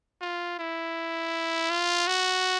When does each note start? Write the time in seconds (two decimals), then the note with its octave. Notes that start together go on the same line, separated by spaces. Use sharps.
0.21 F4
0.59 E4
1.70 F4
2.07 F#4